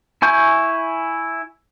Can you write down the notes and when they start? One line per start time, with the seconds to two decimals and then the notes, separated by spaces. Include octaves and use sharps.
0.22 E4 G#5 C#6 G6